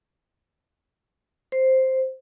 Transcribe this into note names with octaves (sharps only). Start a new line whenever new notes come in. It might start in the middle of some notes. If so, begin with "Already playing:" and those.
C5